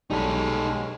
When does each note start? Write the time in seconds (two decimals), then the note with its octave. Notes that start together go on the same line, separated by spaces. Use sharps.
0.10 B1 G3 G#3 C#4 D#4 A4